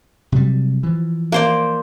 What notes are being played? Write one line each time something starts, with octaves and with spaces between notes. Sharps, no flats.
C3 F#3 G3
E3 F3
A#3 C5 D5